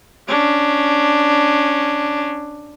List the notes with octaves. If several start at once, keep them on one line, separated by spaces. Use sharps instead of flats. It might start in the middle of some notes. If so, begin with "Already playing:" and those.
C#4 D4